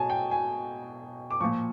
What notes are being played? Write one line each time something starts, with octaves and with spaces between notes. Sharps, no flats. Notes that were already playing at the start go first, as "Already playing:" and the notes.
Already playing: B2 F#3 G#5 A5
G5
G#5
D6
A#2 F3 C#6